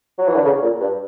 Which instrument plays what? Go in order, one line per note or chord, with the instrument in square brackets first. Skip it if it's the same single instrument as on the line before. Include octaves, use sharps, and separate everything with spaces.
[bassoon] F#3
E3
D3
C#3
A#2
G2